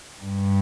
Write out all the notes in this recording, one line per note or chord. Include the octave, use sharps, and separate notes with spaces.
G2